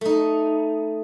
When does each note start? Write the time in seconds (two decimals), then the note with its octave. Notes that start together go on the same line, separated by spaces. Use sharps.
0.01 A3 D#4